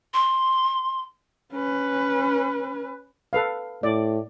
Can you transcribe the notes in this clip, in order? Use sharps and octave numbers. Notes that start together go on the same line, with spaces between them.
C6
C#4 B4
A4 B4 F5
A2 D5